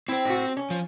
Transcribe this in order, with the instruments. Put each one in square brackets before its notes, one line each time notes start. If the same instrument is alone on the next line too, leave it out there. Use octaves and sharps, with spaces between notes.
[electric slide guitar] C4 C5 [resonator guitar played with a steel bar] E4 G5
[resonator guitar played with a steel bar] A2 F#4
C#4
[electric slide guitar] F3